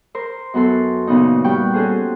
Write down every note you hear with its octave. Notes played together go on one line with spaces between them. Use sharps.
A#4 C5
F#2 B3 F#4 A4 C6
A#2 C#3 B3 D#4
G3 F#5 G5 C#6
C#4 F#4 G#4 A4 C5